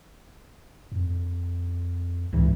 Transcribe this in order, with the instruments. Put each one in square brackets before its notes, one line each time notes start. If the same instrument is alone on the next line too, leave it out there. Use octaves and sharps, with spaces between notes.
[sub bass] F2
[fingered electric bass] C#2 G#2 E3